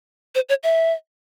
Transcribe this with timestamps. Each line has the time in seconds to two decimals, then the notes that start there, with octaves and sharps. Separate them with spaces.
0.35 C5
0.49 C#5
0.63 E5